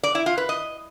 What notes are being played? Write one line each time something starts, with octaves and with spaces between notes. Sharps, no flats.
D5
E4
F4
B4
D#5